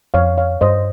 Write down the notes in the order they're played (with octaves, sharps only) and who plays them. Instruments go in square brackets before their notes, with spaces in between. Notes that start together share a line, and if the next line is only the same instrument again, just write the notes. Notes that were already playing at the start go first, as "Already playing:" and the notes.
[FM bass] F2 [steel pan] C#5 F5
[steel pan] C#5 F5
[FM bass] G2 [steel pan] C5 D#5